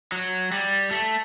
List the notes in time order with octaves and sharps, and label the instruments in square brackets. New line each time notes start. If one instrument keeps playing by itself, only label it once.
[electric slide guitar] F#3
G3
A3